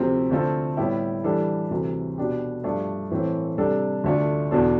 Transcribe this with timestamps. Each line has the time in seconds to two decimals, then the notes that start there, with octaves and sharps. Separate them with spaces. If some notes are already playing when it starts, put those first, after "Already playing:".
Already playing: D2 C3 F3 C4 G4
0.30 D3 A3 C4 F4 A4
0.77 A2 G3 B3 E4 G4
1.24 E3 G3 D4 A4
1.71 D2 C3 E3
2.18 B2 B3 D4 G4
2.63 G2 F3 A3 D4
3.11 A2 E3 A3 C4
3.58 C3 G3 D4 A4
4.04 D2 D3 A3 D4 F4
4.51 E2 B2 B3 D4 A4